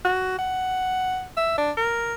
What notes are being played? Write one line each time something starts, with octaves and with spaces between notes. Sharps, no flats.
F#4
F#5
E5
D4
A#4